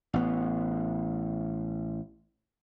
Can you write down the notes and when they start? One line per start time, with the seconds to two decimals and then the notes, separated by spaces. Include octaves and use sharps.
0.14 A1 B3